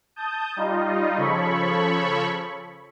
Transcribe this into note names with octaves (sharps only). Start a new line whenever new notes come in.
A5 D#6 G6
G3 D#4 F4 D#5
C#3 F3 A4 C#5 B5 C#6